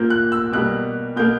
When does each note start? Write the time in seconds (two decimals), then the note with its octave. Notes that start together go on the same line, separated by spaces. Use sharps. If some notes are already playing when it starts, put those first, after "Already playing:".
Already playing: A#2 A#3 G6
0.10 F#6
0.32 E6
0.53 B2 G3 A#3 F#6
1.16 B2 A#3 G6